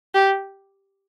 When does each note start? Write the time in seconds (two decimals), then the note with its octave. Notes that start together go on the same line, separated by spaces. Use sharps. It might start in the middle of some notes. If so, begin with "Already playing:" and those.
0.14 G4